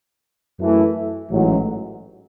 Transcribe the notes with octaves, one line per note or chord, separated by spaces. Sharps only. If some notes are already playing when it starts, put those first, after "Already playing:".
F#2 E3 A3
A1 G#2 F#3